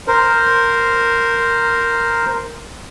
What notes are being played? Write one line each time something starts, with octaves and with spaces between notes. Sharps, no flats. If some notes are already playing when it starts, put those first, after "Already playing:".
A#4 C5